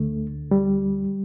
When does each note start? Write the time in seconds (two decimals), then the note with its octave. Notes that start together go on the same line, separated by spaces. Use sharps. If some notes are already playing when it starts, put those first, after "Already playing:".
Already playing: D2 D3 A3
0.51 G3